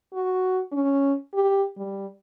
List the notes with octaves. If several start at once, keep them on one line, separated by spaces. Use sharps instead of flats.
F#4
C#4
G4
G3